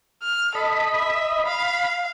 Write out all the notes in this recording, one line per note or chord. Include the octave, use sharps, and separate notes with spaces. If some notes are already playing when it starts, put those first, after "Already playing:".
F6
A4 D#5 B5
E5
F5 B5